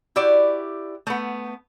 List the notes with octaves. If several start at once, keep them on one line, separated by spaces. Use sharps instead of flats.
E4 F#4 G4 D5
A3 B3